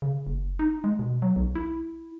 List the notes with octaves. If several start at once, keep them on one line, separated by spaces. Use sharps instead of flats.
C#3
F#1
D#4
G#3
B2
F#3
B1
E4